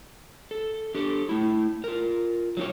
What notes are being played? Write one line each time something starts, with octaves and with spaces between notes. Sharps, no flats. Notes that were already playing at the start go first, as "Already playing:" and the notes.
A4
D4 G4 A4
A3 E4
F4 A#4
F#3 A3 D#4 A#4 C#5